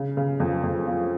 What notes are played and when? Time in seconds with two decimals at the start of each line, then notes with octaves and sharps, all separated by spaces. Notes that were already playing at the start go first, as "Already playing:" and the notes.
Already playing: C#3
0.17 C#3
0.40 F2
0.64 F2
0.87 F3